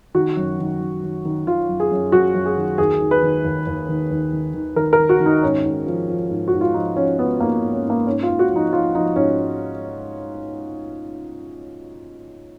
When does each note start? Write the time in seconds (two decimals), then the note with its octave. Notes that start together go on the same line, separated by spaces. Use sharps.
0.15 D#3 F#4
0.37 F#2
0.59 D#3
0.81 D#3
1.03 D#3
1.25 D#3
1.47 D#3 F4
1.69 F#2
1.80 G#4
1.91 F#2
2.12 F#2 F#4
2.34 F#2
2.46 G#4
2.56 D#3
2.78 D#2 G#4
3.01 D#3
3.11 B4
3.22 D#3
3.45 D#2
3.67 D#2
3.89 D#3
4.11 D#2
4.33 D#3
4.54 D#3
4.76 D#3 A#4
4.93 A#4
4.99 D#3
5.09 F#4
5.20 D#3
5.26 D#4
5.43 G#2 C#4
5.65 G#2
5.87 F3
6.09 F3
6.30 G#2
6.48 F#4
6.53 G#2
6.61 F4
6.74 F3 D#4
6.96 F3 C#4
7.18 G#2 B3
7.41 G#2 A#3
7.62 G#2
7.73 C#4
7.85 G#2
7.90 A#3
8.07 G#2 C#4
8.23 F4
8.28 G#2
8.39 F#4
8.51 F3 D#4
8.73 F3 F4
8.94 F3 D#4
9.16 G#2 C#4